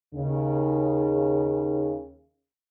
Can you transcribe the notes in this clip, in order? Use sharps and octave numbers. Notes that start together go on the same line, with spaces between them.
D#2 C#3